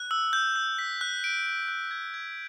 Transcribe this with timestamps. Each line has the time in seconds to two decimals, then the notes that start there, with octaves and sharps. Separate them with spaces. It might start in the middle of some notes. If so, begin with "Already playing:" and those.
Already playing: F#6
0.11 E6
0.33 G6
0.56 E6
0.79 B6
1.01 F#6
1.24 D7
1.46 F#6
1.68 F#6
1.91 G#6
2.14 G#6